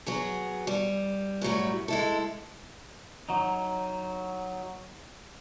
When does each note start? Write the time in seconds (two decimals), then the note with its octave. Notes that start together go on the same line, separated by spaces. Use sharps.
0.06 F#3 B3 G#4
0.67 G3
1.41 F#2 A2 F#3 G3
1.88 G#3 E4 A4
3.29 F#3 D#4